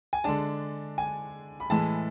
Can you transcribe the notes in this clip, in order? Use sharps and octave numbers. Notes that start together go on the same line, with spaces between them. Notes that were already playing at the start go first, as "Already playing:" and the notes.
G#5
D3 G#3 D4 A5
G#5
B5
A2 E3 G#3 A5